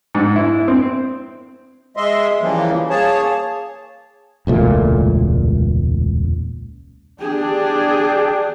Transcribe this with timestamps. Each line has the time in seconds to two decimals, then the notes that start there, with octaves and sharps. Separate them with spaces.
0.15 G#2
0.36 E4
0.68 C4
1.97 G#3 D#5 E5 C6
2.41 C#3 E3 F3 G3 A#3
2.90 A#3 G#4 C#5 A5
4.47 E1 C#2 A#2 A3
7.20 D4 G4 G#4